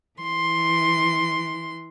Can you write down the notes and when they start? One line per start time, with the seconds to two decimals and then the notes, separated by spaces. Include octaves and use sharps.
0.18 E3 C6